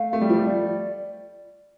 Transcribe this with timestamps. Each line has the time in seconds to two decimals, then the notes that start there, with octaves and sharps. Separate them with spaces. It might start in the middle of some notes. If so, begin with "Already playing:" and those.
Already playing: A3 F5
0.13 A3
0.21 G3
0.29 F3
0.38 G3
0.46 D5